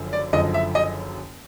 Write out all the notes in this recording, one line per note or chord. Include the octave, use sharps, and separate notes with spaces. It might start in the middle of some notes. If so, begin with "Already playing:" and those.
Already playing: F#1 F#2 D3 F3
D5
F#1 F#2 D3 F3 D#5
E5
D#5